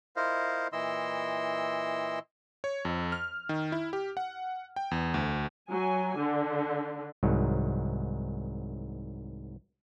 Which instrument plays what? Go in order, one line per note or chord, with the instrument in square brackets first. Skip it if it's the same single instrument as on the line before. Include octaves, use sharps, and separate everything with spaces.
[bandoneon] E4 F4 A#4 C5 D#5 F5
A#2 E3 E4 D#5 C6 E6
[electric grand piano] C#5
F2
F6
D#3
E4
G4
F#5
G5
E2
D2
[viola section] F#3 G#5
D3
[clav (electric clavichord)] C2 G#2 D#3 F#3